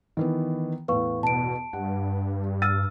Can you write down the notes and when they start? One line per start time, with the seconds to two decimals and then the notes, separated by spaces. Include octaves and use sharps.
0.17 D#3 E3 B3
0.88 E2 A2 B4 F5 C#6
1.23 B2 A5 D7
1.73 G2 F#5
2.62 E6 F6 A6 D#7